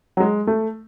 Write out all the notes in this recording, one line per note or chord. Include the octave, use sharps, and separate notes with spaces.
F#3
G#3
A3